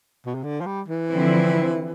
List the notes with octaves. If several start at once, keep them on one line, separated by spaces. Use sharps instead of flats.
B2
C3
D3
F3
G3
E3
D3 F3 C4 E4